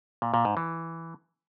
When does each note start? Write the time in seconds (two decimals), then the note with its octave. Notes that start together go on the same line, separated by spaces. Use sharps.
0.22 A#2
0.34 A#2
0.45 G#2
0.57 E3